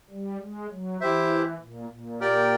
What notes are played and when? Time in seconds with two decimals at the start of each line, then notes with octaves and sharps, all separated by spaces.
0.10 G3
0.40 G#3
0.70 F#3
1.01 E3 E4 G4 C5 E5
1.60 A#2
1.90 A#2
2.20 G4 A#4 D5 G5